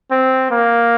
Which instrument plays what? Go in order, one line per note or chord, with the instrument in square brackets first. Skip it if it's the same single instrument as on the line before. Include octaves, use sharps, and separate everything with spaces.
[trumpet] C4
A#3